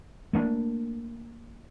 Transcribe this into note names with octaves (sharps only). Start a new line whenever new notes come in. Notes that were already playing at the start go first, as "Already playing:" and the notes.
A3 A#3 D4